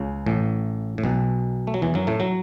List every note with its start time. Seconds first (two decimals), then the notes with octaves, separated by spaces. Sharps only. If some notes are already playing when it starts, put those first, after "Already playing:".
Already playing: C#2 C#3
0.26 A1 A2
0.98 A2
1.04 B1 B2
1.67 A3
1.74 F#3
1.82 E2 E3
1.94 F#2 F#3
2.07 A2 A3
2.20 F#3